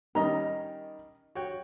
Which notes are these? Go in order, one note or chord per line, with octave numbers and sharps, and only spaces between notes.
D#3 G3 C#4 D#5 A#5
F#4 C#5 G5